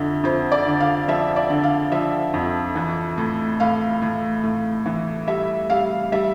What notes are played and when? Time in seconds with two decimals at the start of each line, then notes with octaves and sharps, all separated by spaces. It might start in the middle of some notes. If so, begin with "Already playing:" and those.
Already playing: F2 D3 E5
0.24 F2 C5
0.51 D5
0.66 D3
0.80 F5
1.08 F3 E5
1.36 D5
1.50 D3
1.63 F5
1.92 F3 E5
2.34 F2
2.75 E3
3.18 A2
3.60 A2 F5
4.02 A2
4.43 A2
4.86 E3
5.27 G3 E5
5.70 G3 F5
6.12 G3 E5